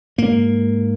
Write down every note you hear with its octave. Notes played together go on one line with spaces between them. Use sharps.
G#2 A#3